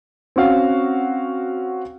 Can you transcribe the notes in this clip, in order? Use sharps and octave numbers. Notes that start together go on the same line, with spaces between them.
C4 C#4 F#4 F5